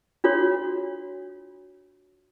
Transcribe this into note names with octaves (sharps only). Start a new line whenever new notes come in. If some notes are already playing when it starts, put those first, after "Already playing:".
D4 F4 F#4 C#5